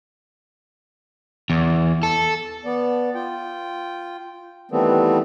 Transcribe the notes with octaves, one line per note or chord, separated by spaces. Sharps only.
E2
A4
B3 D5
F4 G5
D#3 E3 G3 A3 B3 C4